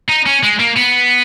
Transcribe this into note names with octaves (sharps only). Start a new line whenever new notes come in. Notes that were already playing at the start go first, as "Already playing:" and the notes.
D#4
C#4
G#3
A#3
B3